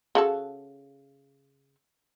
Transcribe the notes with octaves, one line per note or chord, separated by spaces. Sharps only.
C#3 F#4 A4